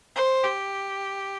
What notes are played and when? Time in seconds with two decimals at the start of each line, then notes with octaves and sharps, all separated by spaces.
0.16 C5
0.44 G4